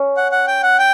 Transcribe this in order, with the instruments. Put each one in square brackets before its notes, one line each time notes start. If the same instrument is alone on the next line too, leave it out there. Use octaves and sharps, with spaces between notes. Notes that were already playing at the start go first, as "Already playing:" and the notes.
Already playing: [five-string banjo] C#4
[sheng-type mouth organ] F#5
F#5
G5
F#5
G5